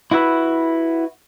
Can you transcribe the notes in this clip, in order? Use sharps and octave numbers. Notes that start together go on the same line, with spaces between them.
E4 F#4 B4 E5